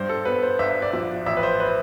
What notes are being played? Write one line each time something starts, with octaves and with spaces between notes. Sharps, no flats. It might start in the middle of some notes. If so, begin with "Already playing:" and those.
Already playing: G2 C5
A4
B3 B4
C5
G1 E5
D5
F3 E5
A1 E5
B4
C5
B4